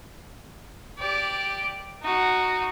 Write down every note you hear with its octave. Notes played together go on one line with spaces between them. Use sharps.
G4 D5
D#4 F#4